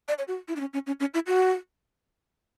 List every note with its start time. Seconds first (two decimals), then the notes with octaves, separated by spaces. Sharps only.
0.08 D5
0.18 C#5
0.28 F#4
0.48 E4
0.56 D4
0.60 C#4
0.73 C#4
0.87 C#4
1.00 C#4
1.14 E4
1.27 F#4